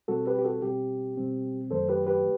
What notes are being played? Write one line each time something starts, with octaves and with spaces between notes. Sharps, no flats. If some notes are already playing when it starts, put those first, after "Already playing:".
B2 G3 C4 F#4 A4
G4 B4
G4
F#4 A4
B2 G3 C4 G4
B2 G3 C4
F#2 D#3 F#3 A3 A4 C5
G4 B4
G4 B4